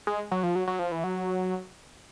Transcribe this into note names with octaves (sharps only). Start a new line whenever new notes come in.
G#3
F#3
F3
F#3
F#3
F3
E3
F#3